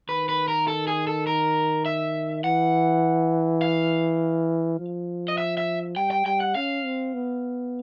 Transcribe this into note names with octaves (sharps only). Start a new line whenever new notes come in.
D#3 B4
B4
A#4
A4
G#4
A4
A#4
E5
E3 F#5
F5
F3
D#5
E5
E5
G3 G5
G5
G3 G5
F#5
C#4 F5
C4
B3